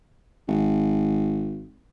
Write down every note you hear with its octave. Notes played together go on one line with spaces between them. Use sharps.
G#1